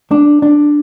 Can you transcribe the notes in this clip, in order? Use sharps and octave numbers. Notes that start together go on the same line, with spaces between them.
D4
D4